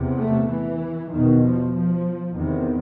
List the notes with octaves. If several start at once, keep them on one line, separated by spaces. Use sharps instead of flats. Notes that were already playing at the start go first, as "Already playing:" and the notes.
Already playing: E2 C3
A3
E3
E2 B2 D#3
F3
F3
E2 C3 D#3